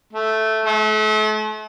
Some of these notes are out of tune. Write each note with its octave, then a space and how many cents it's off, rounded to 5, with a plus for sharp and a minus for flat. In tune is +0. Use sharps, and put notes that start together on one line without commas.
A3 -5
A3 -40